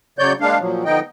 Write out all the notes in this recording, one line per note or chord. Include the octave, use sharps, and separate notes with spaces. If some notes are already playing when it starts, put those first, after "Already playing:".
C#3 F#3 C#5 D5 G6
G#3 A#3 D4 F5
A#2 F3 F#3
D3 F3 B3 D#4 D#5 G5